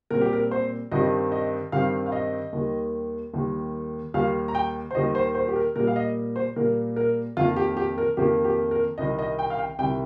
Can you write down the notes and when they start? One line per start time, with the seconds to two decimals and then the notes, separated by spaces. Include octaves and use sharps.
0.10 A#2 G3 C4 A#4
0.21 G4
0.33 A#4
0.51 C5
0.92 G2 D#3 G3 C4 D#5
1.32 D#5
1.72 G2 D#3 G3 C4 F5
2.06 F5
2.12 D#5
2.53 D#2 D#3 G3
3.34 D#2 D#3 G3
4.14 D#2 D#3 G3 F5
4.48 A#5
4.55 G5
4.91 C5
4.95 D#2 D#3 G3 D#5
5.15 C5
5.35 C5
5.48 G4
5.56 A#4
5.76 A#2 G3 A#3 A#4
5.87 F5
5.96 D#5
6.36 C5
6.56 A#2 G3 A#3 A#4
6.96 A#4
7.37 F2 D#3 A#3 F4
7.56 G4
7.77 G4
7.98 A#4
8.17 F2 D#3 A#3 G4
8.45 G4
8.71 A#4
8.98 C2 C3 D#3 D#5
9.19 D#5
9.39 G5
9.50 F5
9.58 G5
9.79 C2 C3 D#3 G5